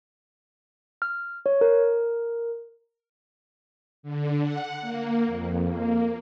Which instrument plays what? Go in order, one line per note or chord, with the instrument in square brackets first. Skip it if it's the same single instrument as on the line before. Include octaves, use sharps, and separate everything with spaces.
[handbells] F6
C#5
A#4
[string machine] D3
F#5
A#3
F2
A#3